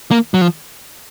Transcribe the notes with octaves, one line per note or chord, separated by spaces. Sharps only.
A#3
F#3
F3